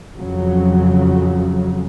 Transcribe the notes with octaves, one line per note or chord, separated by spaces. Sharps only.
F2 C#3 F#3